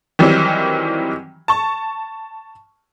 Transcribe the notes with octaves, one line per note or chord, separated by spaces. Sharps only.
D#3 E3 F#3 G3 C4
A5 C#6